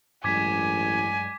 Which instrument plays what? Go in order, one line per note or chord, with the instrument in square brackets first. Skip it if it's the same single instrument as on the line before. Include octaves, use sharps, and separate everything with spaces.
[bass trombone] A1 [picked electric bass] G2 F#3 G#3 [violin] G#5 [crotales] D6 G#6 B6